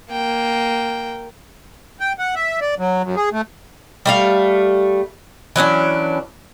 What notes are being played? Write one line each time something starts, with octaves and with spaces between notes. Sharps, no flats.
A#3 G5
G5
F#5
E5
D5
F#3
F#2
G#4
A3
G3 A3 F5
E3 F#3 C#4 D4